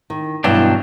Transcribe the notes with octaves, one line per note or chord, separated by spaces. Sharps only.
D#3
G2 B2 E3 F#3 D4 G5